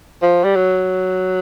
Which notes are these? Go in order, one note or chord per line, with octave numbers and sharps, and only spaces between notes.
F3
G3
F#3